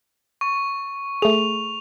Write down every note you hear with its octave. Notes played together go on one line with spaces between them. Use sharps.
C#6
A3 G#4 F7